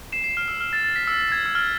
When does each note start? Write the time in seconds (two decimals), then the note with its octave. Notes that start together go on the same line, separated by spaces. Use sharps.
0.13 C7 E7
0.24 C7 E7
0.37 F6
0.48 E6
0.60 F6
0.73 A6
0.84 A6
0.96 B6
1.07 E6
1.32 G#6
1.46 E6
1.55 F6